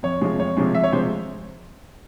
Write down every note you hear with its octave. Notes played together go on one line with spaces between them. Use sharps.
F2 C#5
C3 F3 G#3
F2 C#5
C3 F3 G#3
F2 E5
C#5
C3 F3 G#3 C5